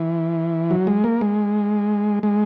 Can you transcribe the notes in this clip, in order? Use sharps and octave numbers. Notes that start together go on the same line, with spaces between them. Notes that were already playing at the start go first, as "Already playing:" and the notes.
Already playing: E3
F#3
G#3
A#3
G#3
G#3